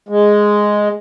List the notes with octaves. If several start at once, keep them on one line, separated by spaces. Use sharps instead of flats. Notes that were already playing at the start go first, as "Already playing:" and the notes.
G#3